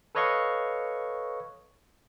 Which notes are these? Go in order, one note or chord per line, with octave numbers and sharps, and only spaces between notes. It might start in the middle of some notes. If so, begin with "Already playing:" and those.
A4 B4 C#5 D#5 F5 C#6